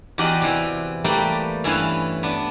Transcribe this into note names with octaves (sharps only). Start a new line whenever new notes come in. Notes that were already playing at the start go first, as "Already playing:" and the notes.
E2 F#4 G4 D5 D#5
C3 E3
G3 A3 A#3 G4 B4 D5
G2 E3 C#4 E4 B4 F5
B3 D4